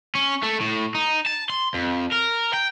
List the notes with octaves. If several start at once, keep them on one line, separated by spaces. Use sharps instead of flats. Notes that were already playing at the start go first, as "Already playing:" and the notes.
C#4
A3
A2
D#4
A5
C6
F2
A#4
G5